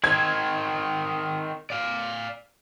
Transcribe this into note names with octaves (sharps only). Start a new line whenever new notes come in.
D#3 C4 G#6
D5 F5